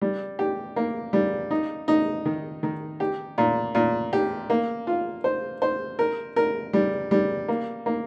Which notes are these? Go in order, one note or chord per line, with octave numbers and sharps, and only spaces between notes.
G3
G4
A#3
G3
D#4
D#4
D#3
D#3
G4
A#2
A#2
G4
A#3
F4
C5
C5
A#4
A#4
G3
G3
A#3
A#3